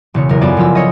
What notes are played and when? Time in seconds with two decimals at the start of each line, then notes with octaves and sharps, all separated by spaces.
0.14 E1 C#3 C#5
0.29 F#1 E2 A#4
0.41 F#2 B3 F4 A4 D5 G#5
0.57 F#1 F3 F4 E6
0.75 C#4 C#5 D#5